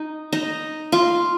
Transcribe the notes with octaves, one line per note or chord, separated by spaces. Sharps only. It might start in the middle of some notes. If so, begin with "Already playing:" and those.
Already playing: D#4
D#4
F4